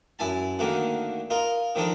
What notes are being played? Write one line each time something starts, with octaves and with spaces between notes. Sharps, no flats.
F#2 E4 G#5 A5
D3 D#3 A3 A#3 F#4
F4 A#4 D#5
D#3 F3 D4 D#4 A4